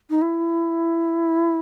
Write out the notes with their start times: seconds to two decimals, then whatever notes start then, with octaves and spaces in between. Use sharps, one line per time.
0.10 D#4
0.22 E4